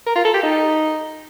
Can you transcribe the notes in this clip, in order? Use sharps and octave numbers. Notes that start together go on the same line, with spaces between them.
A#4
F4
A4
G4
D#4